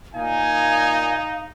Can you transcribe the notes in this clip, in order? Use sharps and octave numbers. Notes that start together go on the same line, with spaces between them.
A#2 D#4 F5 G#5